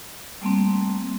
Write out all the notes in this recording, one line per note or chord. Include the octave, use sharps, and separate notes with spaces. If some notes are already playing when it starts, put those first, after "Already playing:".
G3 A3 A#3 C4